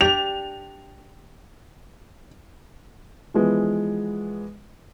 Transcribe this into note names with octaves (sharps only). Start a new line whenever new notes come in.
D4 G4 F7
E3 F3 G#3 B3